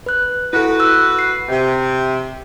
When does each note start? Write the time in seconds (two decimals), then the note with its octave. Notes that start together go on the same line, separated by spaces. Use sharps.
0.06 B4 F#6
0.53 E4 F#4 A4 B4
0.80 E6 F#6
1.19 C7
1.48 C3